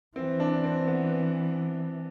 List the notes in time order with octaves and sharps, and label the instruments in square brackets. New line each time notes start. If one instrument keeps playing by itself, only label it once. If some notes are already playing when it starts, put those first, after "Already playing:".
[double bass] E3 [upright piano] C4
[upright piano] D4
C4
B3